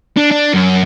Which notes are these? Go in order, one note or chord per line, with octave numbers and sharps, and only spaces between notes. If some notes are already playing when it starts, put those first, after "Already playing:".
D4
D4
F#2